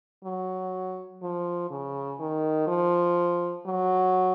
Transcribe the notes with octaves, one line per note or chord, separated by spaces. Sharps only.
F#3
F3
C#3
D#3
F3
F#3